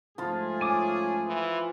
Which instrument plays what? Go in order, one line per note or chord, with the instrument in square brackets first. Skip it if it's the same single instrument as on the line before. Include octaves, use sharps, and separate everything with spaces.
[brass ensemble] G#2 A3 G#4 [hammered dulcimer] F3 F4
[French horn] C#4 [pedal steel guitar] G#5 D6 D#6
[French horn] E3